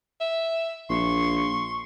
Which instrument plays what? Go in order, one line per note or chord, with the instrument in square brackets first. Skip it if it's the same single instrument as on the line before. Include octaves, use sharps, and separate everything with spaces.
[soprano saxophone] E5
[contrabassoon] A#1 [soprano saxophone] C6 [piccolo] C#6